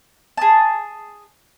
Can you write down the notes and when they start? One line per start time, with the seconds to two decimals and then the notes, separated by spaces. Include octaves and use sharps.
0.37 G#4 A5